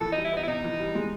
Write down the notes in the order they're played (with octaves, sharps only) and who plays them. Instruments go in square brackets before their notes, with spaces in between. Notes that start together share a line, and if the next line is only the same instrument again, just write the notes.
[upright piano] E3 [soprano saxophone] A4
[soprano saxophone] D#4
[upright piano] G3
[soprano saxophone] E4
[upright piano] B3 [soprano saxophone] D#4
[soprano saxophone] E4
[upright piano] C3 [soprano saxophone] D#4
[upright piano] E3
G3
G#3